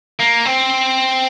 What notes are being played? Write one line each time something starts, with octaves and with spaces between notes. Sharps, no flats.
A#3
C4